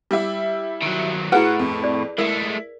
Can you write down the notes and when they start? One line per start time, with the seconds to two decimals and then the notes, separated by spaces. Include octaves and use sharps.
0.11 G3 E4 E5 D6 E6
0.82 D#3 F#3
1.32 A2 E4 F#4 G#4 B4 F#5
1.59 F2
1.84 D5
2.18 G#3 A3 E4 A#4